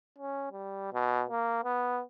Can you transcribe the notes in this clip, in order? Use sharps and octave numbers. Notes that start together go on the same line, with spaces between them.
C#4
G3
B2
A#3
B3